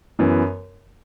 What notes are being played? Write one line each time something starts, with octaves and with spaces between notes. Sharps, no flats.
F#2 E3 B3